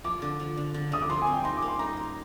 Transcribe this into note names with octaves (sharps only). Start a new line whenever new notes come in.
F3 D6
D3
F3
D3
D3
D3 D#6
D6
F3 C6
G#5
C4
G5
D#4 C6
D6
A#3
C6
D#4 A#5
A#3